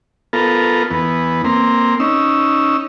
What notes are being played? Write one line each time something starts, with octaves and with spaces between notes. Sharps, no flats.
B3 F4 A4 A#4
E2 B3
A#3 C4
C#4 D#4 E6